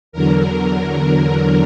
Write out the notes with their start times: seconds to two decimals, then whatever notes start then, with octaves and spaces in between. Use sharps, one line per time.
0.12 E2 D3 F#3 A#4
1.06 E2 D3 F#3